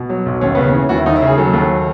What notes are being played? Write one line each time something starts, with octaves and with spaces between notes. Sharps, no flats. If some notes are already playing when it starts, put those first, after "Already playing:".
Already playing: B2
F#3
B1
D#2 C#4
C#3 B3
C#4
E3
D#2 F#4
E4
D#2 D#4
E4
C#3
G#4
F#3 A4
D#2